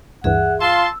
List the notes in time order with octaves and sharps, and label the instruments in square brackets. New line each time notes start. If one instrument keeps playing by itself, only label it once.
[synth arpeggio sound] D2 G2 E3 [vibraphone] G#4 E5 [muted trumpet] F#5
[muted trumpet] F4 [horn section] A5 C6 [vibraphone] E6